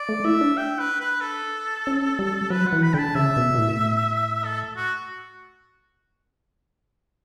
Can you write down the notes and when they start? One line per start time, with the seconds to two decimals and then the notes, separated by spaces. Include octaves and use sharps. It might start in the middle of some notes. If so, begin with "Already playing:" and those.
Already playing: D5
0.09 A3
0.25 E4 E5
0.41 D4
0.57 G5
0.79 B4
1.00 B4
1.21 A4
1.87 C#4
2.19 G3
2.50 F#3 B4
2.67 F#5
2.73 E3
2.83 B5
2.94 D3 G5
2.99 A5
3.15 C#3 E5
3.36 B2
3.55 B2
3.58 A2
4.44 A4
4.77 F#4